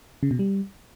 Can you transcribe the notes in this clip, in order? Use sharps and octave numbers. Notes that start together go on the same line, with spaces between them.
C#3
B2
G3